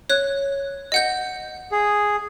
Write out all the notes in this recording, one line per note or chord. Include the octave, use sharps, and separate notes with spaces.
C#5 F#6
D#5 F#5 G6
G#4